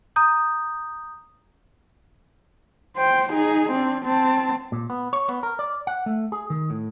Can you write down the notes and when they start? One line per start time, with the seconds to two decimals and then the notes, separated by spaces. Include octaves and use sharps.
0.16 A#5 D#6 G6
2.97 C5 G5
3.33 D#4 G#4
3.71 C4 D4
4.05 C4 A5
4.72 A#2
4.90 B3
5.13 C#5
5.29 B3
5.43 A#4
5.59 D5
5.87 F#5
6.06 A3
6.32 G#4
6.50 D#3
6.70 A2